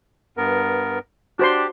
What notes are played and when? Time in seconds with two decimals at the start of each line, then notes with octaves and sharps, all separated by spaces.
0.37 G2 B3 A#4
1.39 D4 F#4 G4 C5 C6